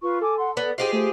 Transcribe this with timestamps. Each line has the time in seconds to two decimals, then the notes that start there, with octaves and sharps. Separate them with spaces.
0.02 F4 B4 C#6
0.21 A4 G#5 D6
0.38 F#5 C6
0.57 B3 D5
0.78 F4 G4 G#4 C5 D#5 C7
0.93 A3 C5